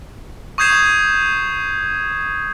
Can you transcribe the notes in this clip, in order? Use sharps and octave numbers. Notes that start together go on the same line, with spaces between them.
C#6 D#6 G6 G#6 C7 E7